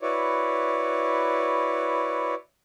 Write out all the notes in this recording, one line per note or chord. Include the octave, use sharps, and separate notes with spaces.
E4 F#4 B4 C#5 D5